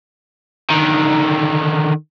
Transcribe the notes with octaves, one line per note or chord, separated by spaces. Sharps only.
D3 D#3